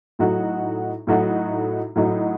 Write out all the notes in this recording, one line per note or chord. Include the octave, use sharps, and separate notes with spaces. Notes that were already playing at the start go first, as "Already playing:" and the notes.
A2 F#3 A3 D#4 F#4
A2 F#3 A3 D#4 F#4
A2 F#3 A3 D#4 F#4